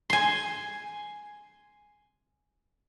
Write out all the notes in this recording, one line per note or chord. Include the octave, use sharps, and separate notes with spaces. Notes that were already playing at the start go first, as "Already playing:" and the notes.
G#5 C6